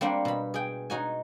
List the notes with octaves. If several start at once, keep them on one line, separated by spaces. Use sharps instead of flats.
G3 A#3 C4 D4 F#5
B2 B5
G#4 G5
D#4 F#4 G#5